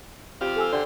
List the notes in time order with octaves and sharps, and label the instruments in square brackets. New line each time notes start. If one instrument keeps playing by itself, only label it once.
[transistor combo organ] C4 F4 F5 [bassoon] G4
[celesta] A4 G#5 E6
[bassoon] D3 [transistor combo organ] G4 C5 C6